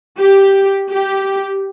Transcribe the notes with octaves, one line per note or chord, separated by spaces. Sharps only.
G4
G4